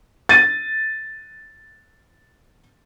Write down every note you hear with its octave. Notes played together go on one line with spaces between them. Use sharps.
A6 D#7